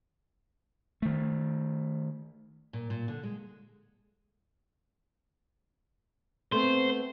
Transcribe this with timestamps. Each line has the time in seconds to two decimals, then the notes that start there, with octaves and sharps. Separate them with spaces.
1.02 D#3 A3
2.73 A#2
2.90 A#2
3.08 D3
3.23 G#3
6.52 A3 B3 C4 C5